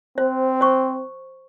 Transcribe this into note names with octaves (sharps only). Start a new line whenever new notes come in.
C4 C5
C5 C#6